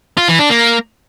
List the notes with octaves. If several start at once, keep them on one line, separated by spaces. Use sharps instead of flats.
F4
E3
D4
A#3